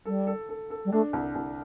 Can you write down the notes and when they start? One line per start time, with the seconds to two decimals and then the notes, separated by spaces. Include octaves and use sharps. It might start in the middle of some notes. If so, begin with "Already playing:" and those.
0.05 G3 A4
0.27 A4
0.49 A4
0.70 A4
0.85 G3
0.92 A3 D4
1.13 C2
1.35 C2